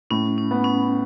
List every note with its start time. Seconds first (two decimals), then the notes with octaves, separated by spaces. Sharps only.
0.11 A2 C#4
0.38 C#4
0.51 B3
0.64 C#4